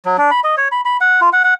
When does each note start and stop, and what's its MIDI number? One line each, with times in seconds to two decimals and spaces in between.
0.05 0.17 54
0.18 0.31 62
0.31 0.40 83
0.44 0.55 75
0.57 0.68 73
0.72 0.81 83
0.85 0.97 83
1.01 1.21 78
1.21 1.30 65
1.33 1.43 78
1.44 1.54 78